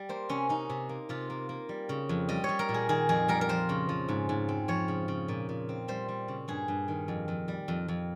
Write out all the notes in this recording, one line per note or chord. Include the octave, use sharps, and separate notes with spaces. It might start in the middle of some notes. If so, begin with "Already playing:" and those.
Already playing: G3
A#3 C5
C3 C#4
C#4 D#4
C3
A#3
C3 F4
A#3
A#3
G3
C#3
F2
G3 D#5
G3 C#5
A#4
A#2
G#4
D#3 G#4
F2 G#4
G3 A#4
A#4
F3 C5
C#3
F3
G#2
G#2
C4
F3 C#5
C#3
C#3
A#2
A#2
C4
G3 C5
G3
C#3
G2 G#4
G2
D#3
F2
F2
G3
F2
F2